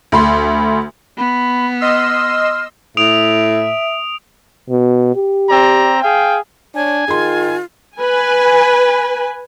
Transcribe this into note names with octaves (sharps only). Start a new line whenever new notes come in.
D2 B5 C6
B3 B5
D#5 C6 E6 F6
A2 E5 D#6 D7 F7
B2
G4
C4 D5 A#5
G#4 F5 G5
D4 C#5 G#5
D#3 F4 G#4 C6
B4 G#5